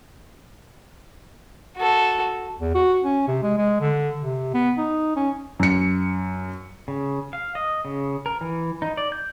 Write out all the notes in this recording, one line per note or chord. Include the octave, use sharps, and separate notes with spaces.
F#4 A4
E2
F#4
C#4
C3
G#3
G#3
D3
C3
B3
D#4
C#4
F#2 C#7
C#3
F5
D#5
C#3
A#4
E3
D#4
D5
G6